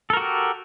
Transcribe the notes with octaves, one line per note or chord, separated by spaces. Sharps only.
F#4 G4 A4 A#4